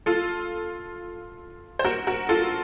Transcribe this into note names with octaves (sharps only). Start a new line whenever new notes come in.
F4 A4
C5
F#4 A#4
F#4 A#4
F4 A4